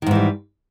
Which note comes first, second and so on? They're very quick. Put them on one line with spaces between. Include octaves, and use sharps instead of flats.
D#3 G#2 E3 G3